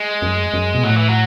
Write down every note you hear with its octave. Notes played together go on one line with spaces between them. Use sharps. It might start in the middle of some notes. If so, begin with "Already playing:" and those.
Already playing: G#3
F#2
F#2
B2
A2 F#3
E3
F#3